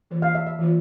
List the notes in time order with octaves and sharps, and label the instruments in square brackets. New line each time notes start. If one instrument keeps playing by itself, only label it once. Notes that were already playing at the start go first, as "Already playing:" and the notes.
[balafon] E3 A#3 F4 C5
[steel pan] F5
E5
E5
[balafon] E3 A#3 F4 C5